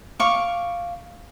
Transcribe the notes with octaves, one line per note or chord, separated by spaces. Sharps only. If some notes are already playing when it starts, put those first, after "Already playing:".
F5 C#6 D6